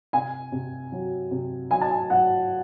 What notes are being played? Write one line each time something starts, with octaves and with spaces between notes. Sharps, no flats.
C3 G#5
C3
F#3
C3
F#3 G#5
A5
G#5
F#3 F#5